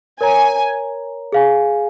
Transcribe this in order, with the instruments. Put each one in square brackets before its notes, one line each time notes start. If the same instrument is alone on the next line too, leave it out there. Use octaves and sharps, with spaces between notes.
[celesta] A#4 C#5 A#5 [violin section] G#5
[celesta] G#4 F5 G#5